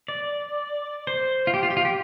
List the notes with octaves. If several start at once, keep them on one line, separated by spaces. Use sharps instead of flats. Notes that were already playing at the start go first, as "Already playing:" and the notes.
D5
C5
F4
G4
F4
G4
F4
G4